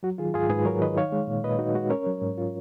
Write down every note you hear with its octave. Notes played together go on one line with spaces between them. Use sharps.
F#3 F#4
D#3 F4 G#4
G#2 F4 G#4
G#2 G#4 B4
F#3 A#4 C#5
D#3 B4 D#5
D#4 C#5 F5
G#3
A#2
A#2 B4 D#5
D#4 F#4
G#3 F#4
C#4 A#4 C#5
F#3
G#2
F4